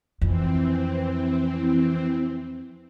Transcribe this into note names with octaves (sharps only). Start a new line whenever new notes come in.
F2 E3 C4